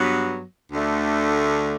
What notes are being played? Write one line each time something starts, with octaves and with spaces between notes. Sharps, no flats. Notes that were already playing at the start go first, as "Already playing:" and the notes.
Already playing: G2 F#3 B3
D2 D3 A3